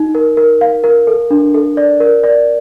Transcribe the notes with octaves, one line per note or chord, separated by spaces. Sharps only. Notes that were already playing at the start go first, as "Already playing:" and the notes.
Already playing: D#4
A#4
A#4
F5
A#4
A4
D4
A4
D5
A#4
D5